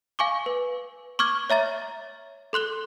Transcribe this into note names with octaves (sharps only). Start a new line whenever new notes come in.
F5 G#5 C#6 D6
B4
C#6 D6 F6 G#6
C#5 E5 A#5 A6
A4 C6 F#6 G7